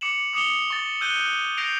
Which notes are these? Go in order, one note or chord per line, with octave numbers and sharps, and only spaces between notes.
D6 C#7 E7 F#7
D6 D#6 C#7 E7 F7 G7
C#6 A6
E6 F#6 G6 D#7 G7
G6 A#6 C7 D7 F7